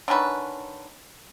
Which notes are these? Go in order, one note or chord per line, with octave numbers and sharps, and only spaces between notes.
D3 D#3 C#4 B4